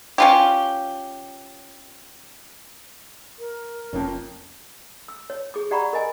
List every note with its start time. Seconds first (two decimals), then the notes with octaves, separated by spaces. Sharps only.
0.18 C#4 F4 G4
3.39 A#4
3.93 F1 F2 A#3 C#4
5.08 E6
5.30 C#5
5.54 G#4 D6
5.71 G4 D5 F#5 A#5 B5 C#6
5.93 A#4 D#5 G#5